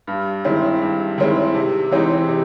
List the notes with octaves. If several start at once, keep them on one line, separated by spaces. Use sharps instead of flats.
G2
D#3 G#3 C4 E4
G2
D#3 G#3 C4 E4
C3
E3 G#3 C4 D#4
C3